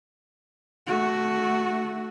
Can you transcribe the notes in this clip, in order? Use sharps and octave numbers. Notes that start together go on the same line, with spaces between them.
A3 F#4